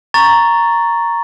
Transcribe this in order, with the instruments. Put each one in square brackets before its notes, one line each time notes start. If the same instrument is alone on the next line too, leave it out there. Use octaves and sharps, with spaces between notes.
[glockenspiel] A#5 C#6 A6